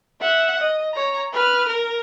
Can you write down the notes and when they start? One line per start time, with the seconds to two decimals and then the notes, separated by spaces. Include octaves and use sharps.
0.21 E5 F#5
0.60 D#5
0.93 C#5 A#5
1.33 B4 F6
1.68 A#4